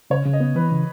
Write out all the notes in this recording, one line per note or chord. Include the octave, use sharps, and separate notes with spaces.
C#3 C#5
C#3
D#5
B3
E3 B4
C#3